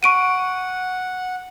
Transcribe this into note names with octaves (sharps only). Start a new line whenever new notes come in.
F#5 C#6 D7 D#7